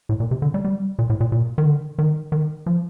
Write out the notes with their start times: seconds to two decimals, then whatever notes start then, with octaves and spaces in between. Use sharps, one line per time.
0.09 A2
0.20 A#2
0.31 C3
0.42 D3
0.54 G3
0.65 G3
0.99 A#2
1.10 A2
1.20 A#2
1.32 A#2
1.58 D#3
1.66 D3
1.99 D#3
2.32 D#3
2.66 F3